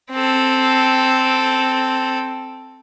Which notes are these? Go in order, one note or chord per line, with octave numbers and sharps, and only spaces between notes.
C4 A4